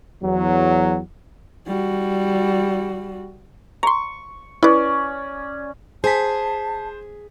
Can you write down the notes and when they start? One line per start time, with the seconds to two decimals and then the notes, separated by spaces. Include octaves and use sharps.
0.23 E2 F#3
1.67 G3 F#4
3.83 A#5 C6 C#6
4.63 C#4 E4 B4 D5
6.04 G#4 C5 A5 B6